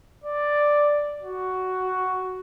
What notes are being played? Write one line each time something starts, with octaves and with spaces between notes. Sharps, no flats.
D5
F#4